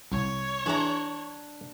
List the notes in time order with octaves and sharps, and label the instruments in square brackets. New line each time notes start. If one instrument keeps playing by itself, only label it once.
[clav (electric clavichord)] C2 [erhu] C#5
[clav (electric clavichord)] E3 G#4 [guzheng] D4 A#5